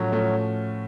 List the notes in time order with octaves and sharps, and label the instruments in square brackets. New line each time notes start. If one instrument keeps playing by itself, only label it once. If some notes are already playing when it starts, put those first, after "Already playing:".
Already playing: [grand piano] A2 F3 A3 C#4 F#4 [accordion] F#3
[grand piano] A2 F3 A3 C#4 F#4